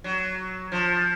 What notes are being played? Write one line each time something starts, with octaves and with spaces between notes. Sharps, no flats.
F#3
F3